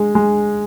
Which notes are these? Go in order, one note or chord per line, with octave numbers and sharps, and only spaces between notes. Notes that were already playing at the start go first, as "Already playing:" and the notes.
Already playing: G#3
G#3